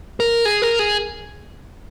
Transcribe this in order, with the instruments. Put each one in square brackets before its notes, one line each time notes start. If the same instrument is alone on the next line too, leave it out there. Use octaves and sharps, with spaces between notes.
[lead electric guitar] A#4
G#4
A#4
G#4